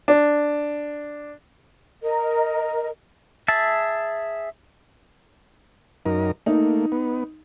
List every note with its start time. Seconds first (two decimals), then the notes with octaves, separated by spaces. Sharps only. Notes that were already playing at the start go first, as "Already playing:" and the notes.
0.08 D4
2.02 A#4 D#5
3.48 G#4 E5 A5
6.06 F#2 D#4 A#4
6.46 A3 A#3 D#4
6.92 B3